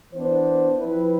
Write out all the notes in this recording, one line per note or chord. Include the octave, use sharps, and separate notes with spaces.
E3 B3 D4 C5
F3 C4 E4 B4